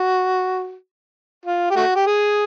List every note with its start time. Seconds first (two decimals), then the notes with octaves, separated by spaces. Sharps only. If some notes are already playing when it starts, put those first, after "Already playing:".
Already playing: F#4
1.45 F4
1.71 G4
1.76 A3 F#4
1.96 G4
2.07 G#4